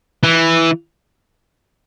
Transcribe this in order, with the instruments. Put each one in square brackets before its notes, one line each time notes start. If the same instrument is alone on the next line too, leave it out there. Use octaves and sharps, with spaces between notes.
[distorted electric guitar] E3